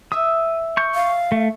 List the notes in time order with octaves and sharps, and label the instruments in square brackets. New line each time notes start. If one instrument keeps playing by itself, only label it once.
[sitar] E5 [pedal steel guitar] D#6
[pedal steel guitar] C#6 G6
[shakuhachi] F5
[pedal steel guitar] A3